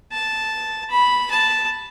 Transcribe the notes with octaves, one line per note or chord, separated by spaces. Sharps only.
A5
B5
A5